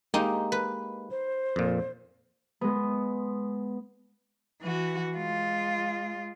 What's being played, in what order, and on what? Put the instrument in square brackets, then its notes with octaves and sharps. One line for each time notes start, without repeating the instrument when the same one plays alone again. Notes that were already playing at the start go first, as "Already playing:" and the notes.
[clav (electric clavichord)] G#3 A#3 G4 [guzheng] D#4
[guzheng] B4
[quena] C5
[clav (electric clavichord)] F2 A#2
[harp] G#3 B3
[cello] E3 F#4
G#3 F4